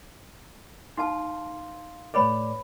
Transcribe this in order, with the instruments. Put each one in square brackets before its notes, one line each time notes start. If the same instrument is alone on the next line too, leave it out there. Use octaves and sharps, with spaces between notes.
[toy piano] D#4 A5 [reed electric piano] F5 C6
[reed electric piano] A2 A3 D5 [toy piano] B4 C#5 B5